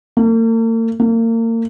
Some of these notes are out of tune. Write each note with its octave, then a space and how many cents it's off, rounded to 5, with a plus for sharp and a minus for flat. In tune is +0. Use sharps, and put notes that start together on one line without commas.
A#3 -45
A#3 -35